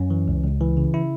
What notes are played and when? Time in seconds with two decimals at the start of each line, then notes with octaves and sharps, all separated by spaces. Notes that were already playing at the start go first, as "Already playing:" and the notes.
Already playing: F#2 C#4
0.10 E3
0.28 C#2
0.44 C#2
0.61 E3
0.77 C#3
0.94 E4